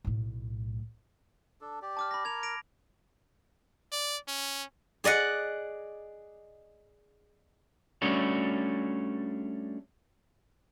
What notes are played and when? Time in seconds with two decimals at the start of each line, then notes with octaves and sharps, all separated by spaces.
0.04 B1 A2
1.61 D4 A4
1.82 G4 D5
1.97 A5 D6 F6
2.11 B5 A#6
2.25 A#4 G#6 F7
2.43 A#6 D7 F7
3.92 D5
4.28 C#4
5.04 G#4 D5 D#5 F#5
8.02 G3 A3 C#4 D4 F#4